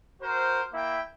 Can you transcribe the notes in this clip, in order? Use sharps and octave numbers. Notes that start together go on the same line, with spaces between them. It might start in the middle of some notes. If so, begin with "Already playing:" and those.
F#4 A#4 C5
A#3 E4 E5 G5